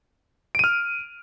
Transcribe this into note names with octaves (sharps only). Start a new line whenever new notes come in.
F6 D7 D#7